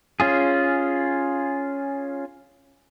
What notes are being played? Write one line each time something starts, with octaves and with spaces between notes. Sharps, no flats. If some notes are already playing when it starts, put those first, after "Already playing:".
C#4 F4 G#4